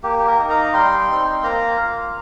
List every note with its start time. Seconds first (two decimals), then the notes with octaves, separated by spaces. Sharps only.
0.03 A#3 G4
0.19 G4
0.27 A#4
0.38 D#4
0.50 F5 A#5
0.73 G3 G5 C6
1.09 C4 D#4
1.43 A#3 F5 A#5
1.78 F4